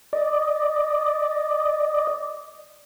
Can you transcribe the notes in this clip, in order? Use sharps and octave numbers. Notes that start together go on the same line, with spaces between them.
D5 D#5